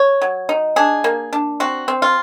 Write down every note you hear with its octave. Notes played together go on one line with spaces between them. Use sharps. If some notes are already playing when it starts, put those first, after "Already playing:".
Already playing: C#5
F#3
D#4
D4 G#4
A#3
D4
C4 F#4
C4
F4